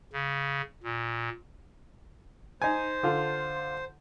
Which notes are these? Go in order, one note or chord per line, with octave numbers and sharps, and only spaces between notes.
C#3
A#2
D#4 C5 G#5
D3 F4 A4